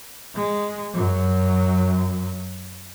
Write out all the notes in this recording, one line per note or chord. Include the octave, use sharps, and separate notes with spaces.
G#3
F#2 F#3